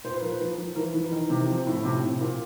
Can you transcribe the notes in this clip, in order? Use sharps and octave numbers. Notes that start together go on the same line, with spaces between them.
A#2 C5
B4
F3 A#4
B4
F3
F3
E3 A#4
E3 B4
D#3 A#4
C3
F3
A2
C3
C3
A#2